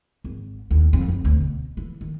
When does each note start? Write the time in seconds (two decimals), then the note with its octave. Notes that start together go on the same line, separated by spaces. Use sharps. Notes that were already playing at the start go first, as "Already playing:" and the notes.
0.24 G#1
0.71 D#2
0.93 F2
1.08 F2
1.25 D2
1.41 B2
1.77 E3
2.01 D#3